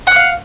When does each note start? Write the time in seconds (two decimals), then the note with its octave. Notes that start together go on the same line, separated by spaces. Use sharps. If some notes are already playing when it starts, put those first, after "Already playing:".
0.07 F#5
0.11 F6
0.16 F5